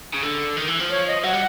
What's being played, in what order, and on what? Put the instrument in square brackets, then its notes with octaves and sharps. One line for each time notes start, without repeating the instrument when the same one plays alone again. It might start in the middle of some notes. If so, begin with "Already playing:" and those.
[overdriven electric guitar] C#3
D3
D#3
E3
F3
[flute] C#5
D#5
[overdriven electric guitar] F#3 [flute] F#5
[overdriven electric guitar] G3